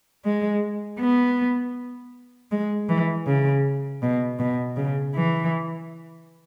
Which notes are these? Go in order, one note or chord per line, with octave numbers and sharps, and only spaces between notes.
G#3
B3
G#3
E3
C#3
B2
B2
C#3
E3